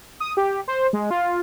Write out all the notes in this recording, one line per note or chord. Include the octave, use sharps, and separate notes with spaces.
D#6
G4
C5
G#3
F4